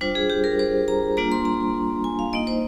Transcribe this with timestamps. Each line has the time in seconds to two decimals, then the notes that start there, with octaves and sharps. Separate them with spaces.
0.01 G3 D4 F4 C5
0.15 G#4
0.30 G4
0.44 A#4
0.59 C5
0.88 A#5
1.17 G3 A#3 D4 F4 A#5
1.32 C6
1.45 A#5
2.04 G#5
2.19 F5
2.33 A#3 D#4 D#5
2.47 C5